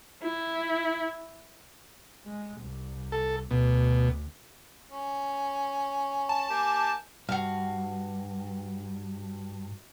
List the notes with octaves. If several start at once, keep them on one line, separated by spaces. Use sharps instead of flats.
E4
G#3
C2
A4
D2 B2
C#4
A5
A#3 G4 G#5
G2 F#4 F5